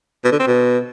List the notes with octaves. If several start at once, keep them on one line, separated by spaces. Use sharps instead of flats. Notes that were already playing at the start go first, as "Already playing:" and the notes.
B2
D3
C4
B2